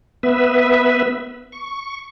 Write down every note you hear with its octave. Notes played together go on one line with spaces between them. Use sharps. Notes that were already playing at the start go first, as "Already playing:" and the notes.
B3 B4 E5
C#6